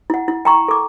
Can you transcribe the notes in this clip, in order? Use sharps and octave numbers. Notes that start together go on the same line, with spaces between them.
E4 F#5
E4
G5 A#5 C#6
A4 D6